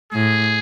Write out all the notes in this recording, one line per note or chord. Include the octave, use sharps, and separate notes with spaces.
A2 G#4